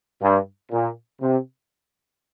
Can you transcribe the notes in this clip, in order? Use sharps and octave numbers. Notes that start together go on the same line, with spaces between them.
G2
A#2
C3